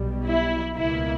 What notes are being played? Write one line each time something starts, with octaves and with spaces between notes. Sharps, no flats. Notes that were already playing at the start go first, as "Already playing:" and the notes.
Already playing: B1 B2 G3
E4
C#2 B2 A#3 E4